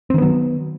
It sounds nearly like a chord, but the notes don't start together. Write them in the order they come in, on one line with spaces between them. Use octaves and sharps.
C4 D#3 B3 F#3